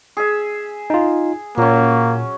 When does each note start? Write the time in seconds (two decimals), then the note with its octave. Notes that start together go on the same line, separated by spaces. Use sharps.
0.17 G#4 E5
0.90 D#4 F4
1.58 A#2 F#3 A#3 C#4